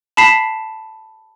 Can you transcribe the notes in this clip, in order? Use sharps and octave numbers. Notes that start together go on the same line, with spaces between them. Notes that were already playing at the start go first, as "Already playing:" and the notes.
A5 B5 B6 C7 E7